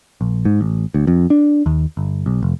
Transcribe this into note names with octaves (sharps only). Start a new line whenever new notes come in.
A#1
G#2
A1
D2
F2
D4
D#2
G1
B1
F1